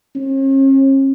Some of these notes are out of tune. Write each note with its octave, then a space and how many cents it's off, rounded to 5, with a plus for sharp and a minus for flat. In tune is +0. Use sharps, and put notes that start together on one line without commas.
C#4 -45